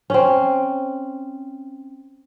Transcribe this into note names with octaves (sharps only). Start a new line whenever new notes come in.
C4 C#4